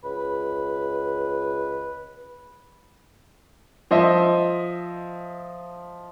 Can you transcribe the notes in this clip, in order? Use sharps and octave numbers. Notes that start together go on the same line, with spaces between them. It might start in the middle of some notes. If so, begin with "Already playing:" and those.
C#2 B4
F3 C5 D#5 E5